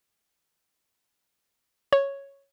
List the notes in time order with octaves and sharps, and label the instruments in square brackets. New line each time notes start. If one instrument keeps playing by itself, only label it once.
[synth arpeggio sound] C#5